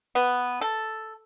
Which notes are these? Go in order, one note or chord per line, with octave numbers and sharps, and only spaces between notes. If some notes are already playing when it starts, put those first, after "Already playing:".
B3
A4